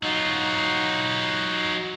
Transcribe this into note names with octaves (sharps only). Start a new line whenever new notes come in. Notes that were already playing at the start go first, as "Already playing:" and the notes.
F#3 D#4 F4 F#4